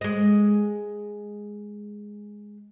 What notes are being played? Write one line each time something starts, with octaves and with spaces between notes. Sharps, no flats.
G#3 D#5